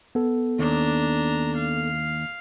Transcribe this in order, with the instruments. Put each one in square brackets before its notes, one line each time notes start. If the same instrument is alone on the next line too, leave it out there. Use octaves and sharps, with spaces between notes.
[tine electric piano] B3 A4
[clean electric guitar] D#2 [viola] D4 A#5
[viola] F5